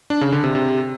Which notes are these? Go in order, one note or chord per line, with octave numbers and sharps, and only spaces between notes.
D4
C#3
D3
C3
C3